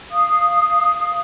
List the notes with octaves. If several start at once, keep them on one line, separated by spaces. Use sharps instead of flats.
F5 D#6